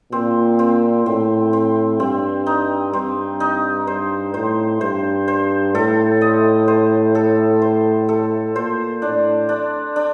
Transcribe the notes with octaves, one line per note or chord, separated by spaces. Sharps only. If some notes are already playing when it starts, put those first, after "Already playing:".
A#2 C4
C4
A2 C4
C4
G2 C4
D#4
G2 C4
D#4
G2 C5
A2 C5
G2 C5
C5
A2 A4
D#5
C5
A4
C5
A4
A#2 C5
A2 D4
D4
D4